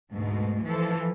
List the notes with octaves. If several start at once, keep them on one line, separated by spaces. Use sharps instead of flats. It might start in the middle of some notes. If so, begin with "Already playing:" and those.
D2 G#2 B2 A3
E3 F3 A4